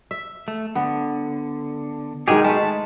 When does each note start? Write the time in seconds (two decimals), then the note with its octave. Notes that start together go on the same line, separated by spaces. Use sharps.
0.11 E5
0.48 A3
0.75 D3 B3
2.28 B2 D#3 G#3 G4 G#4
2.45 G#3 A3 A5 B5